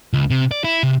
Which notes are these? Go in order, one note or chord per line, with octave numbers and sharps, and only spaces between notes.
C#2
C3
D5
E4
C3